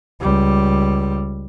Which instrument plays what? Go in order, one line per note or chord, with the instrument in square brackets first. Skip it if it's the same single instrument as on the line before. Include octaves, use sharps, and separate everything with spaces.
[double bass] C#2 G3